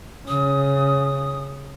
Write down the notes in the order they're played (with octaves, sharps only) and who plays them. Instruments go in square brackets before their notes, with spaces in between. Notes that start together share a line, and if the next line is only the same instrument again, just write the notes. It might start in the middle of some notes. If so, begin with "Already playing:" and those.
[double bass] C#3 [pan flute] D#6